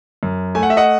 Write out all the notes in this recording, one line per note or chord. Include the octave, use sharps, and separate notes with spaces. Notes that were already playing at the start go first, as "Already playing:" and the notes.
F#2
A3 G#5
F#5
E5
D#5 F#5